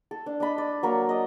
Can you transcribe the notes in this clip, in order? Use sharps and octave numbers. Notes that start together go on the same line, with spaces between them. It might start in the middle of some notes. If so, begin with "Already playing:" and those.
A4
D4
D4 D#5 B5
D5
F#3 A#3 A#4
D#5